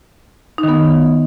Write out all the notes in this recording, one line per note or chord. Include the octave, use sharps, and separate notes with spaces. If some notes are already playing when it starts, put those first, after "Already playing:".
D#4
D#3
B3